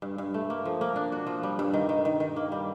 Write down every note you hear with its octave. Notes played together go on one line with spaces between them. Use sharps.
G2
G2
A3
A#3
F3
A#3
D4
F#4
F3
G3
G2
D#3
D#3
D#3
D#3
A#3
G3